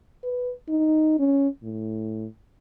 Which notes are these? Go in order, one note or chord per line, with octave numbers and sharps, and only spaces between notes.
B4
D#4
C#4
A2